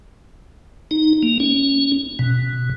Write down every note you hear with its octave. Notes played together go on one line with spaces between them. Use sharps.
D#4
A#3
C#4
B2